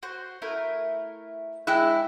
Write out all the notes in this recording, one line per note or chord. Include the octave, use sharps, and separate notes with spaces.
F#4 C5
A3 E4 A#4
G#3 E4 G5 E6 F#6